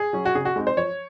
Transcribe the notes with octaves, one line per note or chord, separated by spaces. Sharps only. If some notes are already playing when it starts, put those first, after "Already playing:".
Already playing: G#4
F#3 C#4
F#4
C#3 G#4
F#4
G#3 C4 D#4
C5
F3 C#5